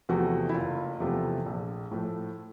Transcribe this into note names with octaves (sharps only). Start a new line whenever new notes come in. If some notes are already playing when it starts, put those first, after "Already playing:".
E2 C3 F3 A3 F#4
E4
F#1 F4
E2 C3 F3 A3
A#1
A2 F3 A3